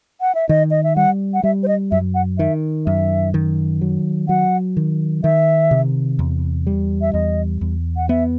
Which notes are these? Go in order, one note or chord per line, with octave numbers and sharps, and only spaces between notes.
F#5
E5
D#3 D#5
D#5
E5
G3 F#5
F#5
G3 E5
C5
D#5
F#2 E5
F#5
D#3 E5
F#2 E5
D#3
F#3
F#3 F#5
D#3
D#3 E5
C3
E2
G3
E5
E2 D#5
E2
F#5
B3 E5